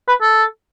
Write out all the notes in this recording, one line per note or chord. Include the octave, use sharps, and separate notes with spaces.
B4
A4